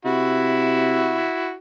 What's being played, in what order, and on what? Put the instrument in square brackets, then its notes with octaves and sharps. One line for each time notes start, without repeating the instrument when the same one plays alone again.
[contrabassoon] C3 [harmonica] E4 F#4